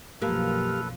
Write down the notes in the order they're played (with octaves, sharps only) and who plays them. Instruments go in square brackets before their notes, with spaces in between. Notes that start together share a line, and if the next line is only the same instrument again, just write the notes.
[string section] B1 F#2 F3 [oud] A#3 [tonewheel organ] G4 F6 [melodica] A4 B4